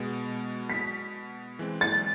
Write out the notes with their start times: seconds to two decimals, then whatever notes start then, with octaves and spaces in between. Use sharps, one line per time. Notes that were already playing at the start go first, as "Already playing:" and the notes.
Already playing: B2 G#3 B3
0.70 B6
1.59 E3 G#3 C4
1.81 A6